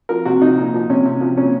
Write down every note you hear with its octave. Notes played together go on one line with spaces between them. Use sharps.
F3 A#4
C3 F#4
F3 D#4
A#2
F3
C3 C#4
C3
F3
A#2 C#4